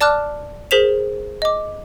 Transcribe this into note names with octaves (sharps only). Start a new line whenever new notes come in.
D5 A5 D6 F6 F#6
G#4 A#4 C5 B6 E7 F7
D#5 D6